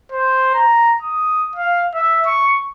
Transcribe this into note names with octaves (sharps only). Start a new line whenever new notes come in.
C5
A#5
D#6
F5
E5
C#6